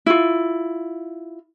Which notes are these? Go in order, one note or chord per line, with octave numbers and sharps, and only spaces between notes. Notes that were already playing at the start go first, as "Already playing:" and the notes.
E4 F4